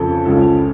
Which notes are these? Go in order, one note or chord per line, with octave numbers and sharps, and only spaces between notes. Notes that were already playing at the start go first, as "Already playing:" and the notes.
Already playing: F2 C#3 F3 A4
C#2 C#3 F3 A4